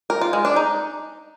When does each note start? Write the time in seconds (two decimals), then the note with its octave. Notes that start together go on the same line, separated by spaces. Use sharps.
0.10 A#4
0.21 F4
0.33 G#3
0.45 D4
0.56 D#4